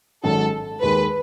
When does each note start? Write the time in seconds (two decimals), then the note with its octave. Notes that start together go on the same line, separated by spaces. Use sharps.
0.23 G#1 G#2 F#3 C#4 F#4 A4
0.82 D#2 D#3 G#3 B4